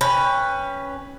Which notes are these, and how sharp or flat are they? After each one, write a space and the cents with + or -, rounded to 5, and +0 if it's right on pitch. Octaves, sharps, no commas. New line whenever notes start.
C#4 +0 B4 +0 G5 +25